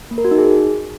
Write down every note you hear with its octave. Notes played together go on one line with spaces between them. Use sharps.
A#3
A#4
F#4
D#4
G#4